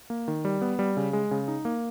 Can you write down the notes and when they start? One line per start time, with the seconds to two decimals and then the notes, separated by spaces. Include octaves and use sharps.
0.10 A#3
0.28 D#3
0.45 G3
0.62 B3
0.79 G3
0.97 C#3
1.13 G#3
1.31 C#3
1.48 D#4
1.65 A#3